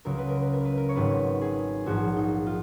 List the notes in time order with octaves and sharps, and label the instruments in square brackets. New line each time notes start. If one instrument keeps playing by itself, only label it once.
[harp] C#2 C#3 F#3 A#4
B4
A#4
B4
A#4
B4
A#4
C#5
G#1 G#2 D#3 F#3 B4
G#4
A#1 G#2 F3 F#4
D#4
F4